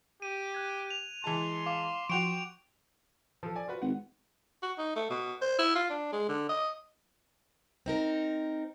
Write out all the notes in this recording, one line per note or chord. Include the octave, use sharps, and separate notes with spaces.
G4 D#7
F#6 G#6
F7
E3 G#3 A5 C6
F5 D6
F3 F#4 G5 C#6 D7 F7
F3 A4
D5 G#5
F4 F#4 B4
G#1 F#5
F#4
D#4
A3
B2
C5
E4
F4
D4
G#3
D3
D#5
C4 D#4 A#4